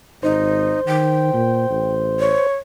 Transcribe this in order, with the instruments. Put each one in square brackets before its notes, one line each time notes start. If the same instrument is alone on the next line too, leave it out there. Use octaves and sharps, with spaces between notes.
[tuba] G#1 [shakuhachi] D#4 [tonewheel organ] C5
[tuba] D#3 [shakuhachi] G5
[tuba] A#2
A1
[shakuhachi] C#5